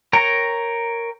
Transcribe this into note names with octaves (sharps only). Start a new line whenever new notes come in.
A#4 C#5 G5 A#5